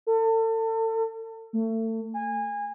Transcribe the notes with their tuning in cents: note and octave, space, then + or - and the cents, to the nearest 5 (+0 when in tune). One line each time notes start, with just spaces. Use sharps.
A4 +35
A3 +30
G#5 -25